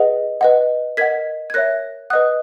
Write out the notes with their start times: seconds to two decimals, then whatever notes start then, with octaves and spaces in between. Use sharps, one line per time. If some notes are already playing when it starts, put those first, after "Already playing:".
Already playing: G#4 B4 D#5 F#5
0.41 B4 D#5 F#5
0.97 A#4 D#5 F#5 G#6 B6
1.50 G#6
1.54 A#4 C#5 E5 F#6 A#6
2.10 B4 D#5 F#5 D#6 F#6